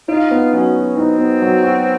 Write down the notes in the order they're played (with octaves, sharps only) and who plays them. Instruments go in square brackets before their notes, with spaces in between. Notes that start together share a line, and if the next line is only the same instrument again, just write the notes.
[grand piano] D#4 [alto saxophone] F4
[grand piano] B3
[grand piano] F#3 [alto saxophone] C#4
[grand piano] F#4
[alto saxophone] C4 [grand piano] D#4
[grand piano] B3
F#3
F#4